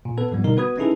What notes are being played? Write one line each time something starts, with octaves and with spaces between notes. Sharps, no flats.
A#2
B3 A4 B4
G#2 F3 G3 B3
B2 D3 G3 D#4 A#4
B3 F#4 B4 B5 D#6 G#6
C#4 D#4 E4 G#4 A4 B4